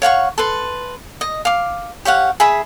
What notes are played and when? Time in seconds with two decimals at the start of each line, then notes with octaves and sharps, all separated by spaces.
0.02 C#5 F5 F#5 C#6
0.38 A4 B4 C6
1.21 D#5
1.45 F5 D6
2.05 G4 C#5 F5 F#5
2.40 G#4 E5 B5